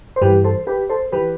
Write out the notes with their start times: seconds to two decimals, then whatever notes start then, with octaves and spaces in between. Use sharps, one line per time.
0.16 C5
0.22 G2 E3 G4 B4
0.44 A4 C5
0.67 G4 B4
0.89 A4 C5
1.12 E3 G4 B4